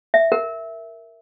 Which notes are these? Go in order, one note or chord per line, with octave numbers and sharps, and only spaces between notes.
E5
A#4